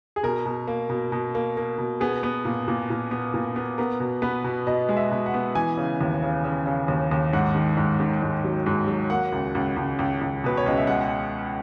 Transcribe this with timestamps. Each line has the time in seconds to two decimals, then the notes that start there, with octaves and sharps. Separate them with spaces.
0.16 G#4
0.23 B2 A#4
0.46 B2
0.67 A#3
0.90 B2
1.12 B2
1.35 A#3
1.57 A#3
1.78 B2
2.00 B3 G#4
2.23 B3
2.45 A#2
2.68 A#2
2.90 A#2
3.11 B3
3.34 A#2
3.56 B3
3.78 B3 A#4
4.00 B2
4.22 B3 B4
4.44 B2
4.67 B2 D#5
4.89 G#3
4.97 E5
5.11 B2
5.26 F#5
5.34 B3
5.55 E3 G#5
5.77 C#3
6.01 D#2
6.23 C#3
6.44 C#3
6.66 C#3
6.88 D#2
7.11 D#2
7.33 G#2 F#5
7.55 D#3
7.77 G#2
8.00 D#3
8.22 G#2
8.44 F#3
8.66 G#2
8.88 F#3
9.10 A#3 F#5
9.32 C#2
9.55 C#2
9.76 C#2
9.99 C#2
10.21 C#2
10.44 B2 B4
10.57 C#5
10.66 C#2 D#5
10.77 E5
10.87 G#3 F#5